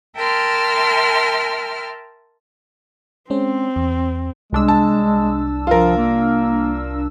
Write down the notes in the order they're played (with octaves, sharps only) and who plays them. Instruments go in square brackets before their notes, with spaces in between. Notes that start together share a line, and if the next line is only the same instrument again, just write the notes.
[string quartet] A#4 E5 G5 A5 C6 F6
[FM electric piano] G#3 C#4 C5 [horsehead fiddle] C4
[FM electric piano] E2
[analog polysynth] C2 D4 E6 [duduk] G#3
[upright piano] A5
[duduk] F3 [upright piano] F4 A#4
[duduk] A#3